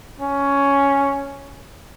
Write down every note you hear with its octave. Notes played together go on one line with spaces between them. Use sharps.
C#4